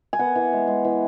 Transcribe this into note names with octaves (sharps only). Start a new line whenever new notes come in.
G#5
B3 F#5
E3
G#3
G#3
E3